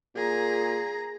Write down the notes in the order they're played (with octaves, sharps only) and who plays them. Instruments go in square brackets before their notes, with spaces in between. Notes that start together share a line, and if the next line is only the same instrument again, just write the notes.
[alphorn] A#2 [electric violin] G#4 A#5